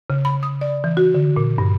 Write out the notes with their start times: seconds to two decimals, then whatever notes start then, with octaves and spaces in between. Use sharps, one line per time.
0.10 C#3
0.25 B5
0.43 D#6
0.61 D5
0.84 E3
0.97 F#4
1.14 D3
1.36 A#2
1.58 G2